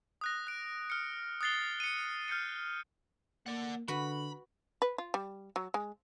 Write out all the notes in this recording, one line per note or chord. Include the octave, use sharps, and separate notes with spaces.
D#6 F#6 A#6
F#6 D7
F6 C#7
D#6 F#6 A6 C7 G7
C#7 D#7
F6 G6 A6 C#7 D#7
A#3 D5 F#5
D3 F#4 B4 B5
B4
F4
G3
F#3
G#3